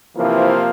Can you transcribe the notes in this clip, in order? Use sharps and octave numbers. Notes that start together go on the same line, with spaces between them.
C3 E3 F3 A#3 E4